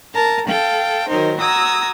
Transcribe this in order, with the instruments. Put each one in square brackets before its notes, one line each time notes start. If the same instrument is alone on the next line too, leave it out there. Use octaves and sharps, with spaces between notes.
[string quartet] A#4 A5 A#5
A4 F5 G5
D#3 F#3 D#4 A#4 C5
F#4 A#5 D#6 E6 G#6